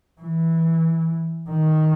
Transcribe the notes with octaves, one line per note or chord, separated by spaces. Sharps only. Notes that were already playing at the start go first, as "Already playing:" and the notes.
E3
D#3